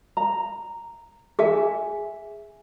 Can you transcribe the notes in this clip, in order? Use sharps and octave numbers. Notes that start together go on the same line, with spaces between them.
A#5
G#4 E5 G#5